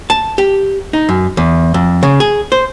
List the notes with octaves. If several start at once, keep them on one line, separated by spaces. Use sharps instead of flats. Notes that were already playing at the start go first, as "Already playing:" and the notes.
A5
G4
D#4
F#2
E2
F2
C#3
G#4
C5